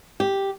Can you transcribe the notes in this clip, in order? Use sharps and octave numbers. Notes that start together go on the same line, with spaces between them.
G4